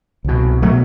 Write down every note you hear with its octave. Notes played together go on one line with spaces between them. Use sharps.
C2 B2
B2 F#3 A3